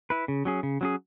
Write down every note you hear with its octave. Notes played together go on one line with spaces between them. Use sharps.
E4 B4
C#3
F#3 C#4 G#4
C#3
F#3 C#4 G#4